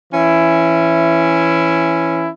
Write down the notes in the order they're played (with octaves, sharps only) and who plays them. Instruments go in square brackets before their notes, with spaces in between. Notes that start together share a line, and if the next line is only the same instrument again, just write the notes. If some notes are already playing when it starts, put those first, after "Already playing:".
[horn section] E3 C#4 E4